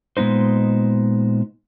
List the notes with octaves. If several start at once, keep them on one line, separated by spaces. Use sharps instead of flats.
A#2 G#3 B3 D#4 C5